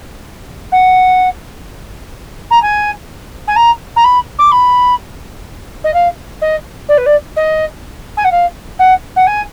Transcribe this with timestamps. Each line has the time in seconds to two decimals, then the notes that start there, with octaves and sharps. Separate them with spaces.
0.72 F#5
2.50 A#5
2.62 G#5
3.47 G#5
3.56 A#5
3.96 A#5
4.04 B5
4.38 D6
4.51 B5
5.84 D#5
5.94 F5
6.41 D#5
6.88 D5
6.97 B4
7.06 D5
7.36 D#5
8.17 G#5
8.24 F#5
8.31 F5
8.79 F#5
9.16 F#5
9.27 G#5